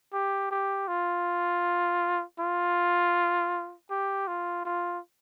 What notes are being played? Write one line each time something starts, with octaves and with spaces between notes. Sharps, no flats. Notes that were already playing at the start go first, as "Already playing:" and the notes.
G4
G4
F4
F4
G4
F4
F4